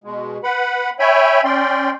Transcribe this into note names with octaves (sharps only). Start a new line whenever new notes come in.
B2 G#3
B4 F#5 B5
C#5 E5 G5 G#5 B5
C#4 D5 G5 C6